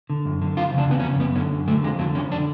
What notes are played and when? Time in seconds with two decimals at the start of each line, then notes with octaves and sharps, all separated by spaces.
0.10 D3
0.25 F#2
0.42 D3
0.57 F2 F4
0.73 C#3
0.78 D4
0.89 F2 B3
1.00 C#4
1.04 C#3
1.20 F#2 B3
1.36 D3 C#4
1.52 F#2
1.68 D3 A3
1.83 F2 G#3
1.99 D3 F#3
2.15 F2 C#4
2.31 D3 D4